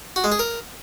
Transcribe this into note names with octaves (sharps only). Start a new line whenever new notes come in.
F#4
G#3
G#4
A#4